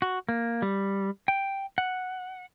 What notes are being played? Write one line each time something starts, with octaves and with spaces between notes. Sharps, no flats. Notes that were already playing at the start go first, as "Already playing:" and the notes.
F#4
A#3
G3
G5
F#5